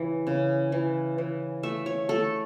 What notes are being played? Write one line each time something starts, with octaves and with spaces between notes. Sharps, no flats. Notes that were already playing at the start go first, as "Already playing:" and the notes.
Already playing: C#3 E3
C#3
E3
E3
A3 E5
C#5
A3 A4